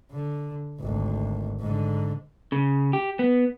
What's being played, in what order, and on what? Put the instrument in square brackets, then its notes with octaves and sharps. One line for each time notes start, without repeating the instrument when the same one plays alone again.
[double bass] D3
G#1 D2
G#2 D3
[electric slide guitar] C#3
G4
B3